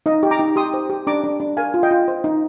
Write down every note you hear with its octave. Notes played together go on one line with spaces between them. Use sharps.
D#4 D#5
G4
A#5 D6
D#4
G4 C6 D#6
C5
G4
D4 A#5 D6
D4
D4
A#4 F5 G#5
F4
D#5 G5
F4
C5
D#4